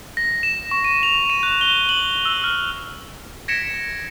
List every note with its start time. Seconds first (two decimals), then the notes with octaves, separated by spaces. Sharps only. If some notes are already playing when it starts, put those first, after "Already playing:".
0.17 A#6
0.43 E7
0.71 C#6
0.84 D#7
1.03 F7
1.30 D#7
1.43 F#6
1.61 G7
1.89 F#7
2.25 E6
2.44 F6
3.48 G#6 A#6 B6 C#7 D7 E7